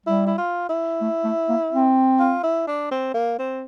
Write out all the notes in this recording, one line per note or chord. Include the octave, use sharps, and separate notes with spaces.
G3 E4
E4
F4
E4
A3
A3
A#3
C4
F4
E4
D4
C4
A#3
C4